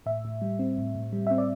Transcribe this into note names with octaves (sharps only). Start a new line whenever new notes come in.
A2 E5
A2
G3
C4
A2
A2
G3
C4 E5
D5